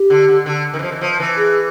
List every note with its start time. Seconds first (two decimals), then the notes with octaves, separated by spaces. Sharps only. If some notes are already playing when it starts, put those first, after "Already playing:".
Already playing: G4
0.10 D3
0.28 D3
0.46 D3
0.74 D#3
0.79 E3
0.83 F3
0.92 E3
1.01 F3
1.20 E3
1.37 G#4